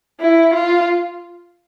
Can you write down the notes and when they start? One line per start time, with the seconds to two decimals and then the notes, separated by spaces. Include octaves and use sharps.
0.20 E4
0.54 F4